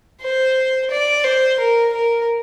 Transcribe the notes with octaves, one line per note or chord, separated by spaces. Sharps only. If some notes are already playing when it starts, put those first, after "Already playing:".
C5
D5
C5
A#4
A#4